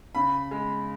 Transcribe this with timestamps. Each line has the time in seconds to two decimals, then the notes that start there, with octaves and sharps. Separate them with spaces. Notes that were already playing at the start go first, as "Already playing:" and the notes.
0.15 C#3 B5
0.51 G#3